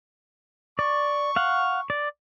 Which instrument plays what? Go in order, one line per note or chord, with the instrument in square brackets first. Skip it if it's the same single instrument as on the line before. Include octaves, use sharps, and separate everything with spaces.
[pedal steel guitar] D5 [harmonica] C#6
[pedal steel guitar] F5 F#5
D5